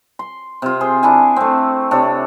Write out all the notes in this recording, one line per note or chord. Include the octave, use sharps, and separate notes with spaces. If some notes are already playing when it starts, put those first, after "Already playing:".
C6
C3 F4
G#4 C5
D4 E4 G#4 G#5
A3 C4
C3 D4 C#5